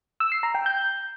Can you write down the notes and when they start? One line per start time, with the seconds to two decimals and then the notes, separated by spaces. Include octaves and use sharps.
0.20 E6
0.32 C7
0.43 A#5
0.55 G5
0.66 G6